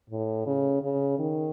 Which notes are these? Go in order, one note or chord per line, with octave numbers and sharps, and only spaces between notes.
A2
C#3
C#3
D#3